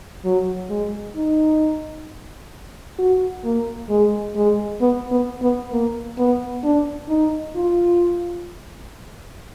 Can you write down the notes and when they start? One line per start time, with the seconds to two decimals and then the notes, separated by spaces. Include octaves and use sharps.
0.25 F#3
0.70 G#3
1.16 D#4
2.99 F#4
3.45 A#3
3.90 G#3
4.36 G#3
4.81 B3
5.12 B3
5.42 B3
5.72 A#3
6.18 B3
6.64 D4
7.10 D#4
7.56 F4